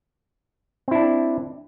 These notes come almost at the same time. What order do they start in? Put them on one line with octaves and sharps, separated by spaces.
C4 E4 D4